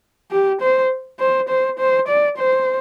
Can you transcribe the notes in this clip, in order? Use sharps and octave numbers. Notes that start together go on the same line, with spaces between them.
G4
C5
C5
C5
C5
D5
C5